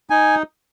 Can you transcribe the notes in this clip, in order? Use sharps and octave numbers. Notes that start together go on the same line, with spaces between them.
D#4 G#5